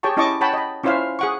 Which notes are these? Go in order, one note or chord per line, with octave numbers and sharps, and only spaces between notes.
G4 G#4 C#5 G5 A5 C#6
C#4 E4 D#5 A5 C#6 D6
C#5 F#5 G5 A5 B5
D#5 B5
C#4 E4 F4 C5 E5 F5
G#4 F#5 C#6